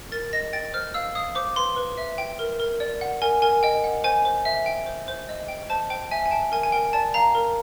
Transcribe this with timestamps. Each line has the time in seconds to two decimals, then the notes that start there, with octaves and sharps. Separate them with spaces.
0.12 A#4 A6
0.33 D#5 A#6
0.53 G5 A6
0.74 C5 F6
0.94 F5 E6
1.15 F5 D#6
1.35 C5 D6
1.56 B4 C6
1.76 B4
1.97 E5
2.18 G5
2.39 A#4
2.60 A#4
2.80 D5
3.01 F#5
3.22 A#4 G#5
3.42 A#4 G#5
3.63 D#5 G5
3.84 F#5
4.04 C5 G#5
4.25 C5
4.45 E5
4.66 G5
4.86 C5
5.08 C5
5.29 D#5
5.48 G5
5.70 C5 A5
5.90 C5 G5
6.11 E5 G#5
6.26 G#5
6.31 G5 A5
6.52 A#4 G#5
6.63 G#5
6.72 A#4 G5
6.93 D5 A5
7.14 F5 A#5
7.35 A#4